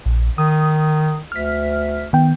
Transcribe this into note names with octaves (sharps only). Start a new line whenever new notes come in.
A#1
D#3 D#6
D2 F6 B6
D#3 B3 G5